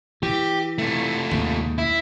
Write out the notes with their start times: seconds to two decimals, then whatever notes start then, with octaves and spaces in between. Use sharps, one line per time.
0.23 E3 G4
0.78 C3 A3
1.31 D#2 G#2
1.78 E4